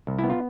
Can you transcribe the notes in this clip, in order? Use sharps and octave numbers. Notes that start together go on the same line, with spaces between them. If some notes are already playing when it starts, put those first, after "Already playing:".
C2
B3 E4
F4